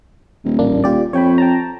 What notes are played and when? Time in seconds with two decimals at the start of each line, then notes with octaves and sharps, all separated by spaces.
0.44 D#1
0.59 A1 A#3 D4
0.84 F4 G4 D5
1.13 F2 C#5 G5 B5
1.38 G5 A5 A#5